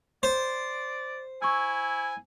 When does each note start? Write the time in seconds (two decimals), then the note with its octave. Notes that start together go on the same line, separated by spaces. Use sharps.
0.23 C5 D5
1.42 E4 G#5 C#6 E6